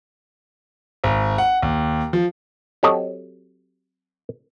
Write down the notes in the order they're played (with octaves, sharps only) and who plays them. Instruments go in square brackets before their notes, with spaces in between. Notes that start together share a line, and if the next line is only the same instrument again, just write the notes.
[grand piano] G#1
F#5
D#2
F3
[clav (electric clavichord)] F#3 C4 G4 A4 C#5 D#5